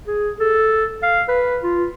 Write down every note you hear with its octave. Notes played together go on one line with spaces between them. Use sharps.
G#4
A4
F5
B4
F4